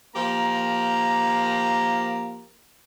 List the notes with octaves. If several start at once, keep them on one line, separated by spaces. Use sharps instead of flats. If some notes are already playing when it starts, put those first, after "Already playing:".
F3 A#3 G4 A#5